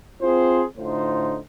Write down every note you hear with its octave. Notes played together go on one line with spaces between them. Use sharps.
C4 F4 G#4 C5
A2 D3 D#4 F4 C5